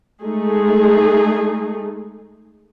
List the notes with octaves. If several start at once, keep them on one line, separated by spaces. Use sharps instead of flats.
G#3 A3 D#4 G#4 A4